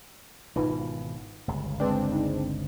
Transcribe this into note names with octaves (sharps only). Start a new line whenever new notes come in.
G#1 B2 E3 D#4 F4 B4
G1 C#2
G#3 C4 D4 B4 G5
D#4